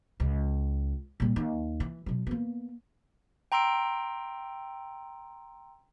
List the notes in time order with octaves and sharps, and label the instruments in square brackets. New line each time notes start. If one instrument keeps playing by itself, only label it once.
[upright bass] C#2
A#2 G3
D#2
E3
B2 F#3
A#3 B3
[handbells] G5 A#5 C6 E6 D7